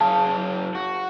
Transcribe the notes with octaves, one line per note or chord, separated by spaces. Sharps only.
F#2 G#4 F5 A5
F#4